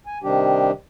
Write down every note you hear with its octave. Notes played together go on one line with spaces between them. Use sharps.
G#5
C3 D#3 G3 D4 G4